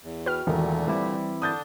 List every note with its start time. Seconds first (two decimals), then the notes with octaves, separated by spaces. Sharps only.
0.03 E2
0.26 F#4 B4 G5 F6
0.47 E1 A#2 D3 D#3 A3
0.88 E3 G3 C4 E4
1.42 D3 D4 D#6 G6 A6